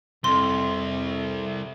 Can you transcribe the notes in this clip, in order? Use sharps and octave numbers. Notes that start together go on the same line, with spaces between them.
C2 F2 C6